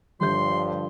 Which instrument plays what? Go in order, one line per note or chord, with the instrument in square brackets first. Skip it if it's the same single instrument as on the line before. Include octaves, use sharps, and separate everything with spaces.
[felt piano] G1 G4 G6 [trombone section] G2 D3 F3 [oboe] C6